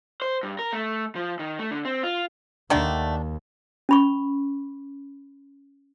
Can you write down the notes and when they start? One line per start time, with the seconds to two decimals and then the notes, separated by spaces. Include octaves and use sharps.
0.22 C5
0.43 G2
0.59 A#4
0.73 A3
1.15 F3
1.39 D#3
1.59 A3
1.71 D3
1.85 C4
2.03 F4
2.70 D#2 D3 D#3 A3 D4 G5
3.89 C#4 B5 C#6